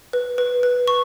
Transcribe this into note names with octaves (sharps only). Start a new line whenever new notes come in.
B4
B4
B4
C#6